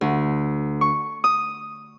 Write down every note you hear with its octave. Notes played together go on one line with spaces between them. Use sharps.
D2
C#6
D#6